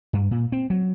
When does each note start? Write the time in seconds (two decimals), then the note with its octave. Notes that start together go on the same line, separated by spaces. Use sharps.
0.13 G2
0.31 A#2
0.52 C4
0.70 F#3